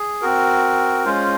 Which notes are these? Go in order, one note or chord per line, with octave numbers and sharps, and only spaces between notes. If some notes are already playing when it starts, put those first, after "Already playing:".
Already playing: G#4
C4 F#4 A#4
G#3 C#4 F4 C5